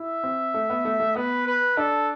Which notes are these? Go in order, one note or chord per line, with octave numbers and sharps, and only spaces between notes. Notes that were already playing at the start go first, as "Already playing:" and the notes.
Already playing: E4 E5
C4
A3
B3
A3
A3
B3 B4
B4
D4 A4